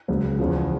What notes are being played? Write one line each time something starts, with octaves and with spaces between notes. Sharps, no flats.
C#2 C#3 F#3
E2 C#3 F3